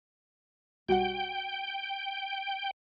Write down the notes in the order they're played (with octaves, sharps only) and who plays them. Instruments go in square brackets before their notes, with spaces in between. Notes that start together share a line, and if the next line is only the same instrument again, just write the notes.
[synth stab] B1 G3 F#5 [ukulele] F#4 [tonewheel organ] G5